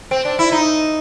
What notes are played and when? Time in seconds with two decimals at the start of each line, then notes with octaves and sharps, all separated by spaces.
0.11 C4
0.25 D4
0.39 E4
0.52 D#4